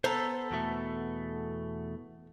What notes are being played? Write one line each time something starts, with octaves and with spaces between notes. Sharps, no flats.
B3 A4 C5 A#5
E2 B2 A3